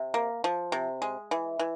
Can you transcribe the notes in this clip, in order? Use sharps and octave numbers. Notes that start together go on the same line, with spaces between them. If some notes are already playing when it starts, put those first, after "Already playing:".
Already playing: C3
A#3
F3
C3
G#3
E3
E3